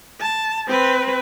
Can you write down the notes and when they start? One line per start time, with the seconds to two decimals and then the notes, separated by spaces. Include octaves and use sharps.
0.21 A5
0.68 C4 B4